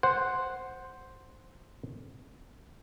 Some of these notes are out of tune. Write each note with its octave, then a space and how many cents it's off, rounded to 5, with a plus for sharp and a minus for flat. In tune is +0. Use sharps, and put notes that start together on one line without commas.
C5 +0 F#5 +0